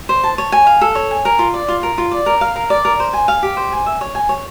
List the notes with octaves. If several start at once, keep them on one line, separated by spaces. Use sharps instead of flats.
C5
A5
C#5
G#5
F5
A4
C#5
G#5
A#4
F4
D5
F4
A#4
F4
D5
A#4
F5
A#4
D5
A#4
C5
G#5
F5
G4
C5
G#5
E5
C#5
G#5
C#5